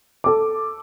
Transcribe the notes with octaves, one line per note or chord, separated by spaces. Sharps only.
A4 D6